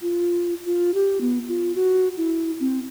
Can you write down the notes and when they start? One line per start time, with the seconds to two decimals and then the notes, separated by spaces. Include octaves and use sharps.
0.01 F4
0.66 F4
0.94 G4
1.21 B3
1.48 F4
1.75 F#4
2.17 E4
2.60 C4